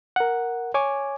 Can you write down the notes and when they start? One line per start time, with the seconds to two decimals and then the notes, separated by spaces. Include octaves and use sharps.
0.16 A#4 F#5
0.74 C#5 G#5 D6